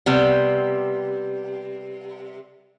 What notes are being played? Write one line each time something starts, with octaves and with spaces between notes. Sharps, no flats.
C3 G3 B3